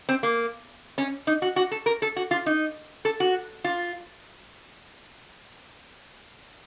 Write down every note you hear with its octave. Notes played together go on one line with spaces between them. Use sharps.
C4
A#3
C#4
D#4
F#4
F#4
A4
A#4
A4
F#4
F4
D#4
A4
F#4
F4